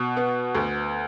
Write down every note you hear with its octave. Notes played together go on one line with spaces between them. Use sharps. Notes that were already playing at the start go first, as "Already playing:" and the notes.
Already playing: B2
B3
D2